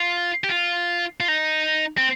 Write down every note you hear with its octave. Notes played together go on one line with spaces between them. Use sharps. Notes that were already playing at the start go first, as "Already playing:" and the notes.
Already playing: F4
G4
F4
F4
D#4
C4